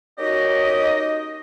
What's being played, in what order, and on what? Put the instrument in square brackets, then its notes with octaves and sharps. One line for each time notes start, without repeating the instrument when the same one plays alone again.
[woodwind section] A#3 C#4 D#4 F#4 G4 D#5